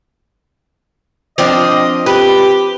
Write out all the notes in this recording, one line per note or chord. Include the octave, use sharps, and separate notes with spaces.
F3 C4 D4 D#5
G4 B4